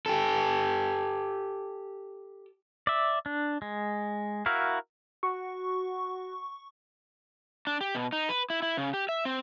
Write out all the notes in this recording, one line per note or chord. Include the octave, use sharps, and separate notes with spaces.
G4 A4
D5 E5
D4
G#3
E4 F#4 A#4 F5
F#4 C#6
D4
G4
B2
D#4
B4
E4
E4
C#3
G4
E5
C4